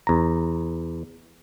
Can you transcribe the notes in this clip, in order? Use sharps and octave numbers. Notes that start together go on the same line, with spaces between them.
E2 A#5